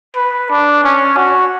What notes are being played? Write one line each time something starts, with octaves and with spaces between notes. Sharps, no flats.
B4
D4
C#4
F#4